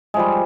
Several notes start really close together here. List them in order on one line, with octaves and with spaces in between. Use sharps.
G#3 F3 G3